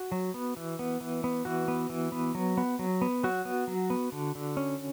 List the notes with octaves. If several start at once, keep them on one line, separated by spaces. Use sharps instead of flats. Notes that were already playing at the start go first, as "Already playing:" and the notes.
Already playing: F#4
F#3
B3
E3
B3
E3
B3
E3 F#4
B3
E3
B3
F#3
B3
F#3
B3
F#3 F#4
B3
F#3
B3
D3
D3
C#4